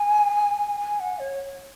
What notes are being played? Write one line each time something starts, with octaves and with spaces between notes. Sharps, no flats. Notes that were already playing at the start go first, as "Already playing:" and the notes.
Already playing: G#5
G#5
F#5
C#5